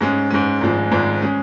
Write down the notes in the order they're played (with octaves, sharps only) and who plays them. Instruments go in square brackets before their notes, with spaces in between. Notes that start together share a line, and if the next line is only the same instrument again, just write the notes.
[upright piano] G#2 G#3 C#4
G#2 G#3 C#4
G#1 G#2 F3 G#3
G#1 G#2 F3 G#3
G#3 C#4